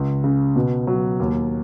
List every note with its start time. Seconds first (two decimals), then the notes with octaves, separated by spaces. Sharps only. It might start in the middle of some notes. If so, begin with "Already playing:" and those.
Already playing: C#2
0.24 C#3
0.56 B2
0.87 F#3
1.20 D#2